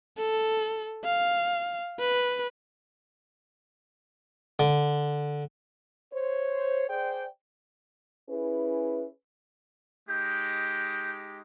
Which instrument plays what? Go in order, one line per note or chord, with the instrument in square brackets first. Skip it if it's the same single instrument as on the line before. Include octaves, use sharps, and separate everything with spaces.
[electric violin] A4
F5
B4
[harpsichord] D3
[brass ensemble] C5 C#5
G#4 C5 D5 G5
[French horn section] C#4 E4 G#4 B4
[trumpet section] G#3 D#4 G4 [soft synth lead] G6